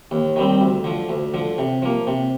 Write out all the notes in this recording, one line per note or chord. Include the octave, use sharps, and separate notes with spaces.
D#2
D#3 G3 C4
D2
D3 F3
D2
D3 F3
C3
F3 A#3
C3